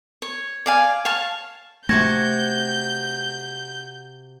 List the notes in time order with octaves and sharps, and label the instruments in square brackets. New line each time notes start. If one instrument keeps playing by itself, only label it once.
[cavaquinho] C#5
D5 F5 G#5
C#5 F5 A5
[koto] C3 F#4 A5 [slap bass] A3 [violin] G6 [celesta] G#6 A#6